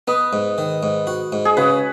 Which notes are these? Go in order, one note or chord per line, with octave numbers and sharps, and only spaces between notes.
B3 B4 D#5
G#2
D#3
G#2
F#4
G#2
G#4
C#3 F#4 B4